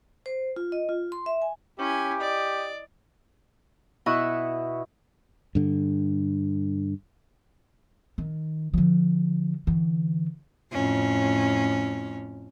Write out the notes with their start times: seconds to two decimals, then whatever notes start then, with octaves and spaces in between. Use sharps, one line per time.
0.26 C5
0.56 F4
0.72 D#5
0.89 F4
1.12 C6
1.26 E5
1.42 G#5
1.79 C#4 E4 G4 G#5
2.20 D5 D#5
4.06 B2 E4 D#5 E5 C#6 F#6
5.55 G2 D3
8.18 D#3
8.74 D3 F3
9.67 D3 E3
10.72 F2 A2 C#4